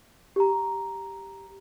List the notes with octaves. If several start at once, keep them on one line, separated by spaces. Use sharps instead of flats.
G4 A#5